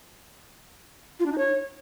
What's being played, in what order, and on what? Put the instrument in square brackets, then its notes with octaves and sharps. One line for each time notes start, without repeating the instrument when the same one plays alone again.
[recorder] F4
D4
D#4
C#5